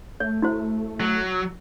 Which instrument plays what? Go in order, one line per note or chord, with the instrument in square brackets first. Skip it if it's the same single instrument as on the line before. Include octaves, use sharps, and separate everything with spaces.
[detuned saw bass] A3 [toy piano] C#5
[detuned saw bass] A3 [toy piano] E4 F#4 C5
[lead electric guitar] F#3